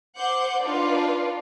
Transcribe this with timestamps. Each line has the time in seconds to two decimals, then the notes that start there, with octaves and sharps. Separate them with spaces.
0.17 C5 F#5 D6 G6
0.63 D4 D#4 F4 B4 D5